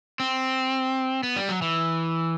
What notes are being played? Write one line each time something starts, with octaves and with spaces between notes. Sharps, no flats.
C4
B3
G3
F#3
E3